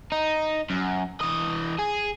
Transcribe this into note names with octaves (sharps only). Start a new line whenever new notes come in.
D#4
F#2
E3 D#5
G#4